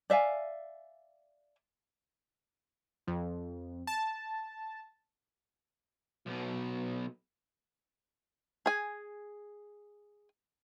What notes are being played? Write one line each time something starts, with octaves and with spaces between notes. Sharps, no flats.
D5 E5 F5 G#5
F2
A5
B1 B2
G#4 G#5